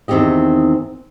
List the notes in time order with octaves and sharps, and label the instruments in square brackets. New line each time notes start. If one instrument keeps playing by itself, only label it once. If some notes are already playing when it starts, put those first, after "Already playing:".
[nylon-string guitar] E2 D#3 C4 D#4 G4 D#5